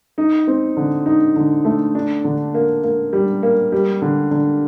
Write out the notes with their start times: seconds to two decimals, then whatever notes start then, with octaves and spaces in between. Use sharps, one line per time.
0.18 D#4
0.47 C4
0.77 D3
1.06 D#4
1.36 D3
1.65 A3
1.95 D4
2.24 D3
2.54 A#3
2.84 A#3
3.13 G3
3.43 A#3
3.72 G3
4.02 D3
4.31 D3